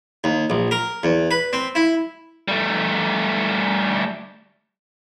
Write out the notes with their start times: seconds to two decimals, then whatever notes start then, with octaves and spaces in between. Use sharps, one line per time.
0.24 D#2
0.50 A#1
0.71 A#4
1.03 E2
1.31 B4
1.53 C4
1.75 E4
2.48 G3 A3